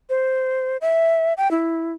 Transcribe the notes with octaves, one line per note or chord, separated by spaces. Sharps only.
C5
E5
G5
E4